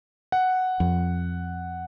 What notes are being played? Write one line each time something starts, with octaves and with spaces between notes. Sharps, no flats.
F#5
F2